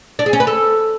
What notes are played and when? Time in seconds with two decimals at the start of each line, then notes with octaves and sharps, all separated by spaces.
0.19 D4
0.26 G#4
0.33 C#4
0.40 B4
0.47 A4